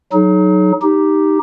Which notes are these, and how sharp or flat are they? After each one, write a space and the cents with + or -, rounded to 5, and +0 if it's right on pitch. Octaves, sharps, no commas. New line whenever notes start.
F#3 +0 D#4 +0 G#4 +40
D#4 +0 G4 +0